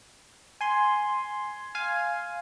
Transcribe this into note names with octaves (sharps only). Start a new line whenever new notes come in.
G#5 C6
F5 G#5